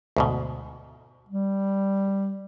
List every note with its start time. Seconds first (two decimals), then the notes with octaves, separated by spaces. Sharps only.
0.17 D2 G#2 B2
1.29 G3